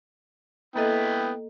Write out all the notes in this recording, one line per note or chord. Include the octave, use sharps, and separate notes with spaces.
A#3 B3 E4 A4 D#5 G5